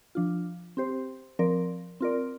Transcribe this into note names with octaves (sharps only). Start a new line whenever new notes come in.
F3 D4 F4
C4 G4 C5
F3 C4 A#4 D5
C4 F4 A#4 D5